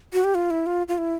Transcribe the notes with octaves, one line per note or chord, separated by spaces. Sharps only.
F#4
G4
F4
E4
F4
F4
E4